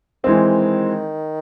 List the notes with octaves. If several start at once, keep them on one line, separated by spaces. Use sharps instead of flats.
D#3 E3 G#3 C4